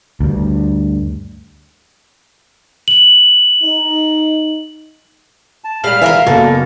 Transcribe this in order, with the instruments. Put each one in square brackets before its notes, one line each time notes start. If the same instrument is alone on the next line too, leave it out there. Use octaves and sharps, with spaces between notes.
[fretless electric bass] D2 G2
[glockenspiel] F#7
[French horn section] D#4
[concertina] A5
[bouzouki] A#2 G3 F5 [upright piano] G#3 [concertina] F6
[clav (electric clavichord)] E3 [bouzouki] F4 A#4 E5
[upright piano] F#1 F#3 B3 [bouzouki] A#3 [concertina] A4